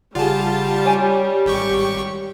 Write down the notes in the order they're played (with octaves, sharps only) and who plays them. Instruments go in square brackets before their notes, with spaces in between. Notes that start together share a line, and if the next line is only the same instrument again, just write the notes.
[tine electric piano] G1 C#3 F#5 [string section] G3 [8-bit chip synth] F4 A5 [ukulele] G#4 D5
[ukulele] C#4 G5 G#5 [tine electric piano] C#5
[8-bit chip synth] G#1 G4 C#6